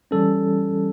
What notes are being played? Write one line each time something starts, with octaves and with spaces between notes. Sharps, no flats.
E3 G3 C#4 A4